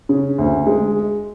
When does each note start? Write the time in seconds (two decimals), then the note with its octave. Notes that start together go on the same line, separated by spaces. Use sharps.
0.09 C#3
0.38 D2
0.67 G#3